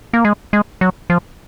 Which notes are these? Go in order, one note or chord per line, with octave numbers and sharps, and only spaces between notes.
A#3
G#3
G#3
F#3
F3